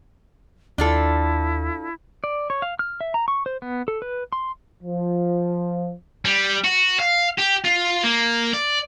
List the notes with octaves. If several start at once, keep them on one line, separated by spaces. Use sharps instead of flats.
D#2 D4 E4 F4 A4
D5
C#5
F5
F6
E5
A#5
C#6
C5
B3
A4
B4
C6
F3
G3
F#4
F5
G4
F4
A#3
D5